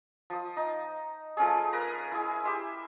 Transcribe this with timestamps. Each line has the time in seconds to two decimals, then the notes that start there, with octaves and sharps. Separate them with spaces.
0.30 F3 D#6
0.57 D#4
1.37 F3 A3 C#4 G#4
1.73 A#4 B4 A#5
2.12 E4 G#4
2.44 G4 E5 C6